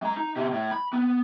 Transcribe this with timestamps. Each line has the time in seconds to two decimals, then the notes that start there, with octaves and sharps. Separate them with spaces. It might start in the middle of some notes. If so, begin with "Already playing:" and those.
0.02 G#3 A#5
0.17 D#4
0.36 B2 G4
0.53 A2
0.71 B5
0.93 B3